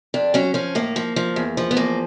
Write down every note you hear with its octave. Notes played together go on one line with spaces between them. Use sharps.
F2 D4
F#3 C#4
F3 C#4
A2 A#3
F3
F3
E2
F3
B3
E2 A#3